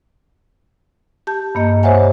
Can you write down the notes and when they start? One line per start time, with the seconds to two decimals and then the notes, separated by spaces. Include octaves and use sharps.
1.27 G4 A5 G6
1.55 G2 A#3 D#5
1.83 G4 C5 C#5 E5 F#5 G#5